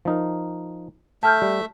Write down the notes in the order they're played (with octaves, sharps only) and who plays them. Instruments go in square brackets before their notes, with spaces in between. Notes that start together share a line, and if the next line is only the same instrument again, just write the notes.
[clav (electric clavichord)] F3 D#4 A#4
[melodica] A3 E5 [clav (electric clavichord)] G5 [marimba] A5 F6 G6
[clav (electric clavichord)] G3